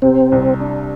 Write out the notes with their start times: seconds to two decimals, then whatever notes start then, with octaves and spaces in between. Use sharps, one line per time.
0.02 C3 C4
0.32 C2
0.60 D4